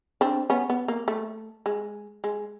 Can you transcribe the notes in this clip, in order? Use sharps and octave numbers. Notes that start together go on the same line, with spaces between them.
C4 D4
B3 C#4
B3
A#3
A3
G#3
G#3